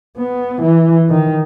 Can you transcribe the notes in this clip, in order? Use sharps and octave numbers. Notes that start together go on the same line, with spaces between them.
B3
E3
D#3